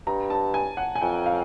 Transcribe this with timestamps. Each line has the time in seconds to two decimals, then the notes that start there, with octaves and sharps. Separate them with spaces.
0.07 G2 A#5
0.30 A5
0.54 G#5
0.77 F#5
0.95 G#5
1.01 F2 G5
1.26 F5